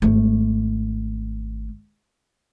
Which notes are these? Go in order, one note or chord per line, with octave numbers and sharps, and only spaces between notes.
G#1 A3